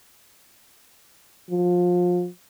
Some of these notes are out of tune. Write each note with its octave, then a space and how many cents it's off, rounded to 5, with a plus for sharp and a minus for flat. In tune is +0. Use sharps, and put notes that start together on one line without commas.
F3 +25